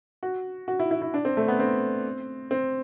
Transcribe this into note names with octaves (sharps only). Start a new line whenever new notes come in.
F#4
F#4
E4
E4
E4
D4
C4
A3
B3
C4
C4